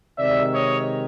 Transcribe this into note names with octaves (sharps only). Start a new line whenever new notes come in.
C3 D#3 G#3 D5 E5
C#5 D#5